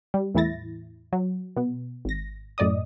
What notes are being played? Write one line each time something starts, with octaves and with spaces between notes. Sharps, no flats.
G3
E2 A2 E3 E4 A6 A#6
F#3
B2 B3
G#1 A#6
F#2 A2 D5 D#5 D#6